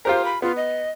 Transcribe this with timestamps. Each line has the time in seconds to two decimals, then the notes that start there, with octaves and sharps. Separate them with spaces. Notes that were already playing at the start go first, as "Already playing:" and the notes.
0.05 F4 G4 A#4 C5
0.25 B5
0.42 B3 F4
0.57 D#5